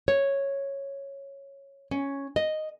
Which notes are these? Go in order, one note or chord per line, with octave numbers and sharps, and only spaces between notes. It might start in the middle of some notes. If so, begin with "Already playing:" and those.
C#5
C#4
D#5